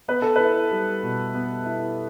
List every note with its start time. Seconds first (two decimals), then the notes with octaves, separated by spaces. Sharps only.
0.08 B3 B4
0.22 A4
0.36 E4 B4
0.71 G3
1.03 B2
1.35 B3
1.66 E4